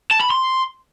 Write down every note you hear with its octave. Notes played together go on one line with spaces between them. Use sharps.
A5
B5
C6